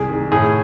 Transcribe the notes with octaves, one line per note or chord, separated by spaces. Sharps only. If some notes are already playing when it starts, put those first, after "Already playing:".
Already playing: C2 G#4
D#3
A2 G#4